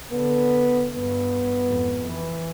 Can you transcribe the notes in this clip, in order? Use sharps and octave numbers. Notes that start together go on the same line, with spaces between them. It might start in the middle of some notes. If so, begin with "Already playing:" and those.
D3 B3
G2 B3
F2 G#2
E3